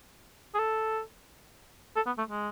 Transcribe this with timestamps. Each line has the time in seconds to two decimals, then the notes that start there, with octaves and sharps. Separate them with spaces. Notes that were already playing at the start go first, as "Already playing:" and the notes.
0.54 G#4
0.59 A4
1.96 A4
2.06 B3
2.18 A3
2.29 G#3